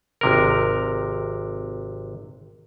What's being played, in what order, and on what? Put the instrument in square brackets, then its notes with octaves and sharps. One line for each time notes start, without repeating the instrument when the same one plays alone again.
[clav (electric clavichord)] G#1 C3 A#4